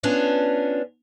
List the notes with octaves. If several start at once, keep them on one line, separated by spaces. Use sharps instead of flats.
B3 C#4 D4 F4